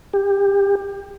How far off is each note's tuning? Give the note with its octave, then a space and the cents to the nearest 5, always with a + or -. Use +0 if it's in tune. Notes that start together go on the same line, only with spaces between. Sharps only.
G4 +25